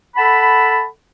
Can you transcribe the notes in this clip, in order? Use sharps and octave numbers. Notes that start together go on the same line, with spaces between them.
A4 F#5 A5 B5